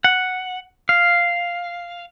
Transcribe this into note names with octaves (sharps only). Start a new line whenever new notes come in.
F#5
F5